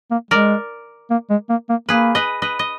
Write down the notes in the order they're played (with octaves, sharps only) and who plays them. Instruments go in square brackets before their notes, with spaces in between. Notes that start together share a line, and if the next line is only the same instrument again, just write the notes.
[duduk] A#3
[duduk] G#3 [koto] A#4 D5
[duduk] A#3
G#3
A#3
A#3
[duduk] A#3 [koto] G#4 B4
[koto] B4 D#5
B4 D#5
D#5